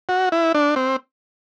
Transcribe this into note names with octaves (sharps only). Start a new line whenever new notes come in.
F#4
E4
D4
C4